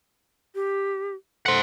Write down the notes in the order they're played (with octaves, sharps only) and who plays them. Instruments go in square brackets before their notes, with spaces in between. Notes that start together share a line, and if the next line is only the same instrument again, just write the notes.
[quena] G4
[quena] A4 [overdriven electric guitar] C5 F#5